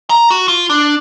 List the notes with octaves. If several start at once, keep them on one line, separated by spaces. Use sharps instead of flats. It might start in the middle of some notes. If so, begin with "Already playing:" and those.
A#5
F#4
F4
D4